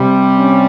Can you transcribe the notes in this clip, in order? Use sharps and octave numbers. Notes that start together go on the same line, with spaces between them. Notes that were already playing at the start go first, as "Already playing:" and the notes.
Already playing: C3 G3
C#4